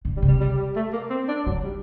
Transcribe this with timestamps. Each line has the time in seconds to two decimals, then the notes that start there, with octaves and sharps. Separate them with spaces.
0.05 D3
0.17 G3
0.22 C3
0.28 G3
0.41 G3
0.57 G3
0.76 A3
0.93 A#3
1.10 C4
1.28 D4
1.46 D#3 F#3
1.64 G3